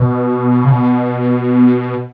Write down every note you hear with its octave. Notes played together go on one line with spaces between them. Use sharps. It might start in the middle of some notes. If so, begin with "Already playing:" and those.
Already playing: B2
C#3
B2